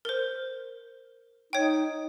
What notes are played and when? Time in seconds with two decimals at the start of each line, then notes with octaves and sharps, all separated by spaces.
0.05 A#4 C5
1.53 D#4 C#5 G5